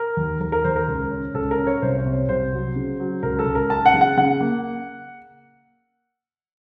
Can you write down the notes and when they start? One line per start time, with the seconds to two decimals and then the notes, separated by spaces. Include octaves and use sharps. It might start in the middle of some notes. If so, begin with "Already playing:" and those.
Already playing: A#4
0.17 D#2
0.40 D#2 A#4
0.52 A#4
0.64 D#2 C5
0.76 A#4
0.88 C#2
1.11 C#4
1.34 C#2 A4
1.51 A#4
1.58 C#4
1.67 C#5
1.82 C2 C5
1.98 C#5
2.05 C3
2.13 C5
2.29 C2 C5
2.53 F#3
2.76 C#3
3.00 F#3
3.23 C#2 A#4
3.39 A4
3.46 C#2
3.55 A#4
3.70 F#2 A5
3.86 F#5
3.94 C#3
4.01 F#5
4.17 C#3 F#5
4.41 A#3